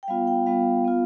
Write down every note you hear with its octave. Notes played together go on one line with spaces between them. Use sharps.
G5
G3 B3 F4 F5
G5
G3 B3 F4 F5
B3 F4